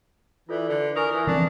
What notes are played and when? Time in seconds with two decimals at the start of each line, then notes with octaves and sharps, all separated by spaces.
0.49 E3 F4 A4 D5
0.69 D3
0.96 A#4 G#5 C#6 D#6
1.12 E3
1.27 E3 F3 C4 D4